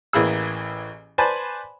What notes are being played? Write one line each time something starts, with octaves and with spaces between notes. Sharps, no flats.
A1 E3 A#3 G#4 B5 E6
B4 C5 D5 G#5 A5 B5